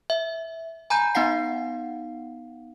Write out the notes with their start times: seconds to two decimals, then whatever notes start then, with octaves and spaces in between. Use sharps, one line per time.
0.10 E5
0.90 G#5 A#5 B5 G6
1.15 B3 D#4 F5 F#5 C7